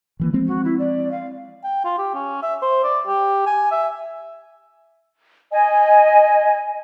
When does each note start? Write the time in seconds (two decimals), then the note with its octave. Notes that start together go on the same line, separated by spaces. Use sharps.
0.20 D#3 E3 A#3
0.33 F3 G#3 C4
0.47 F#4
0.64 E4
0.79 D5
1.11 F5
1.64 G5
1.84 F4
1.98 G4
2.14 C#4
2.43 E5
2.62 C5
2.84 D5
3.07 G4
3.46 G#5
3.71 E5
5.52 D#5 G#5